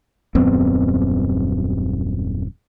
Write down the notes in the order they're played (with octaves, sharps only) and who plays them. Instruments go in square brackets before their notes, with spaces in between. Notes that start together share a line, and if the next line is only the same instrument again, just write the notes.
[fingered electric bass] D#1 F#2 B3 C4